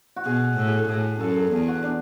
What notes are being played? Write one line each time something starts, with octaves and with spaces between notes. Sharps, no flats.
F#4
B2 G#4
A2
G#4
A4
A2 G#4
F#2 A4
G#4
E2 G#4
F#4
D4